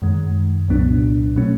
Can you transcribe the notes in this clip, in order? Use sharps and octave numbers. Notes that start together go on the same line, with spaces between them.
F#2 D#3 G#3
C2 A#2 F#3 B3 D4
B2 F#3 A3 C#4